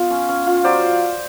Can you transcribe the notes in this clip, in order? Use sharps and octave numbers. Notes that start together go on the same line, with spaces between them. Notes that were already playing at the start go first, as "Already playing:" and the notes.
Already playing: B3 F4
C#4
C#4
F4
F#3 C5 D5